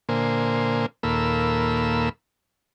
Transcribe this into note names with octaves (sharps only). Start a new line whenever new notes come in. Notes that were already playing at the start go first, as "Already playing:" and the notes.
A#2 D3 A#3 C5 G#5
D#2 A#2 A#3 A4 B5 E6